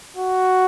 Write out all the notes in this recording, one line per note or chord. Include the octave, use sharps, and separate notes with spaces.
F#4